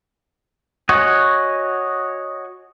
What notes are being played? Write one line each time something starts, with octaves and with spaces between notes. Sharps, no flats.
F#4 C#5 D#5 F#5 G#5